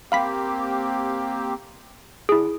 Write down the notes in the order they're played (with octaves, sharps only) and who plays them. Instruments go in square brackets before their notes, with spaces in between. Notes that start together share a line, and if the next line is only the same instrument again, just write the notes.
[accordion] A#3 C4 G4 [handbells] F5 B5 B6
[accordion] D3 [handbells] E4 G#4